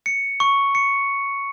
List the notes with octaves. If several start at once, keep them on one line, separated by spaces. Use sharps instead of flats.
C#7
C#6
C#7